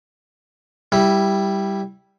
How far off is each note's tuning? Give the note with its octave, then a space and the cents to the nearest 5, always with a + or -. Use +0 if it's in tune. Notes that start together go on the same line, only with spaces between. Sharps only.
G3 +0 E4 +0